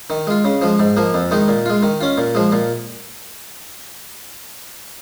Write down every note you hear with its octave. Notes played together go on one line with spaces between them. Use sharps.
D#3
G#3 F4
C#3
F3 G#3
G#2
F3 A#3
F2
D#3 G#3 D#4
A#2
G#3 F4
D#3
C#4 F4
A#2
F3 G#3
A#2